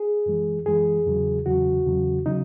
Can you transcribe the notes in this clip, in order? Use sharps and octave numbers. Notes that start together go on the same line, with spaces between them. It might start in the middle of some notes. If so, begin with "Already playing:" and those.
Already playing: G#4
F#2 E3 G#3
F#2 E3 G#3 G#4
E2 C#3 F#3
E2 C#3 F#3 F#4
E2 C#3 F#3
C#3 F#3 D#4